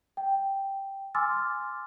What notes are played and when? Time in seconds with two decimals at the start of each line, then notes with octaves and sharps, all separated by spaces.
0.17 G5
1.15 G#5 C6 D6 E6 F6 A6